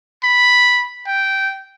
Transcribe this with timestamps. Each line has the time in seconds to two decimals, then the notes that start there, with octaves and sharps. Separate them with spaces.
0.23 B5
1.06 G5